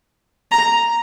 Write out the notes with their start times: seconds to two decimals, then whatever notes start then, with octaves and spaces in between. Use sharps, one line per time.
0.52 A#5